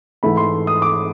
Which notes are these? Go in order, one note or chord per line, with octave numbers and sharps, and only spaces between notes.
G#2 E3 A3 B5
C6
D#6
D6